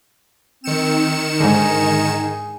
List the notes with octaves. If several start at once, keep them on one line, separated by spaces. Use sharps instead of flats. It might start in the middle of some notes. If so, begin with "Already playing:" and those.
D#3 C4 C#7 E7
G#2 D3 D#4 G#4